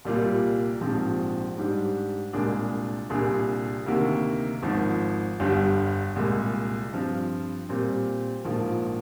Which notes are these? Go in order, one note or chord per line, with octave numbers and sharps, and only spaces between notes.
C2 A#2 G3 A#3 F4
A#1 G#2 F3 C4 G4
G#2 G3 D4
C2 A#2 G#3 D4 G#4
C2 A#2 G3 D4 G#4
D2 C3 D#3 A#3
G#1 G#2 F3
G1 G2 D3 G3
C2 A#2 G#3
G2 F3 C4 F4
A#2 G3 C4
A#1 G#2 F3 A#3 F4